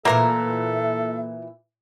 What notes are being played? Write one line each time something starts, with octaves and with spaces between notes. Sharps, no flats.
A#2 E3 A#3 A4 A#4 E5